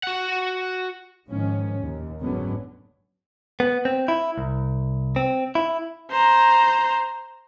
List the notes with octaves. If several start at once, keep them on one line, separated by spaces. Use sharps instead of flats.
F#4 F#5
G#2 D#3 F3 C#4
D#2 A#2
F#1 G#2 D3 F#3 B3 C#4
B3
C4
E4
C2
C4
E4
C5 A#5